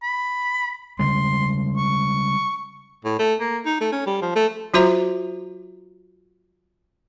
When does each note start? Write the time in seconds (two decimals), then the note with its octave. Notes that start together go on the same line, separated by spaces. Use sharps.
0.03 B5
0.99 C#3 G3 G#3 C6
1.77 C#6
3.05 A2
3.19 A3
3.40 A#3
3.66 D#4
3.81 A3
3.92 C#4
4.07 G3
4.22 F3
4.36 A3
4.74 F#3 F4 F#4 C5 E5 A#5